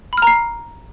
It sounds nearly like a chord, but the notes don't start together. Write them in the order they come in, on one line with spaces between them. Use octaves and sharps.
B5 F6 A#5 C7